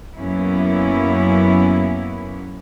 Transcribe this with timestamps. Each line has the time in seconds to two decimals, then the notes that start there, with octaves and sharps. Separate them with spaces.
0.17 F#2 A#3 B3 C#4 E4